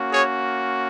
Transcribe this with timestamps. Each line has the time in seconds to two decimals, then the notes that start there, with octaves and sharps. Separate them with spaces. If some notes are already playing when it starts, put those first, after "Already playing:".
Already playing: A#3 C#4 F#4
0.12 G#4 C#5